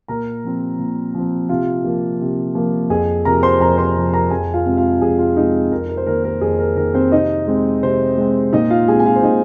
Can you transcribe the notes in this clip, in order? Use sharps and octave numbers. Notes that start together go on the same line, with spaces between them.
A#2 A#4 A#5
F3 C4
A#2
F3 C4
C3 F4 F5
F3 A#3
C3
F3 A#3
F2 G#4 G#5
C3 F3 A#4 A#5
C5 C6
F2 A#4 A#5
C5 C6
C3 F3
A#4 A#5
F2 G#4 G#5
F4 F5
C3 G#3 C4
F4 F5
F2 G#4 G#5
F4 F5
C3 G#3 C4 D#4 D#5
F2 A#4
A#4
C5
D#3 A#3 A#4
A#4
F2 G#4
A#4
D#3 A#3 A#4
C4 C5
C3 D#4 D#5
G#3 C4
C3 C4 C5
G#3 C4
A#2 D#4 D#5
F4 F5
G#3 C4 G#4 G#5
G#5
F4 F5
C5
A#2 D#4 D#5